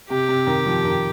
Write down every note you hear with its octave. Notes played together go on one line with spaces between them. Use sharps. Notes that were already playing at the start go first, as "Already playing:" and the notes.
C3 G4
C3
D#3
F3
D#3